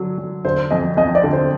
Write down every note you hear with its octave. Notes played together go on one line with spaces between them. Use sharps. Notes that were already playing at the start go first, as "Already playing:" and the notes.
Already playing: D3 F#3
F#3
D3 C5
F2 D#5
F2 D#5
D5
D3
C5